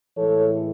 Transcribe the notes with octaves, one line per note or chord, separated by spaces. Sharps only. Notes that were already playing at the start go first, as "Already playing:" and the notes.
A2 E3 G#3 A4 C#5